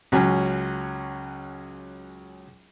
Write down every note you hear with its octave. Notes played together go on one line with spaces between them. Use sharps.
C#2 F#3 C#4 G#5